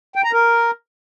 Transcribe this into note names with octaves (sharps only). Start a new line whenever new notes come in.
G5
A#5
A#4